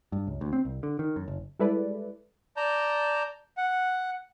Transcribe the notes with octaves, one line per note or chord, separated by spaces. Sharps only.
G2
C#2
D2
C4
C2
D3
D#3
F#2
F#1
G3 G#3 E4 A4 B4 D5
D5 A5 A#5 G6
F#5